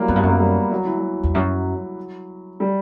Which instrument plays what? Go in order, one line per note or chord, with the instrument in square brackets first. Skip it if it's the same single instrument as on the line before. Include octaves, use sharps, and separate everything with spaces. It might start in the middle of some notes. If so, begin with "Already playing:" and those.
Already playing: [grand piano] E3 F#3 G3 A#3
[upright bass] F#2 [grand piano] B3
[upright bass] G2
F#2
[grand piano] A#3
G3
F#3
E3
F#3
[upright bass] E2
[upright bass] F#2 [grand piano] F#3
[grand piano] G3